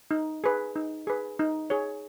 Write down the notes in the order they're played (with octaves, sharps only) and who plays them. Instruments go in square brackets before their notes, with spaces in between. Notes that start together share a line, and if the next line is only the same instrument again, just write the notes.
[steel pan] D#4
G#4 B4
D#4
G#4 B4
D#4
G#4 C#5